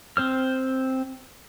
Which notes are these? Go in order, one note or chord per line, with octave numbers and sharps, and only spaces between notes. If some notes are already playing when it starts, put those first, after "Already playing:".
C4 C5 F6